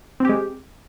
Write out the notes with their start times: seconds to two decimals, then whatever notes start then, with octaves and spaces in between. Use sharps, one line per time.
0.20 C4
0.25 G4
0.29 G#3